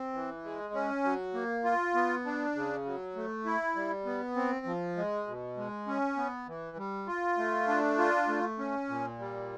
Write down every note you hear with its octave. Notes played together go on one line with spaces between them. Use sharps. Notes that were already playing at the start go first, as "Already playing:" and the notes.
Already playing: C4
E3
G#3
C#4
F#3
A#3
F4
B3
D4
C#3
F#3
A3
E4
G3
B3
C4
F3
G#3
B2
G#3
C#4
B3
E3
G3
F4
A3
D4
F4
A3
C#4
A#2
G3